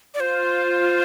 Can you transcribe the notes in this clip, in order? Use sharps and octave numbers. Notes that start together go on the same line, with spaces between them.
D5
F4 C5